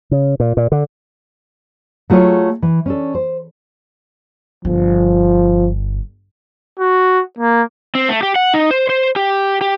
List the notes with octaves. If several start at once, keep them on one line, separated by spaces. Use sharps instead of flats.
C#3
A#2
A#2
D3
F#3 A3 F4 G#4 C#5
E3
C#4 D4 A4
C5
G1 F3
F#4
A#3
C4
A3
G4
F#5
D#4
C5
C5
G4
G4